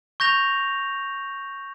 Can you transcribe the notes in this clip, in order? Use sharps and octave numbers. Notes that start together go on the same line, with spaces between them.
C#6 G6 A#6 F7